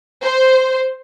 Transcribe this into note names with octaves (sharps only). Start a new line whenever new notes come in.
C5